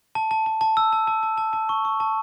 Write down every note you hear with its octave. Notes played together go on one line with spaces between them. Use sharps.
A5
A5
A5
A5
E6
A5
A5
A5
A5
A5
C#6
C#6
A5